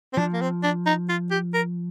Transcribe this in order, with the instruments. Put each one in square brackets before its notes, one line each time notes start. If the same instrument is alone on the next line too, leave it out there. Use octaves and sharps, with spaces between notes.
[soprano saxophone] C4
[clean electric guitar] F3 [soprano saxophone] D4
[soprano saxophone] A#3
C4
D4
D#4
F4
G4
A#4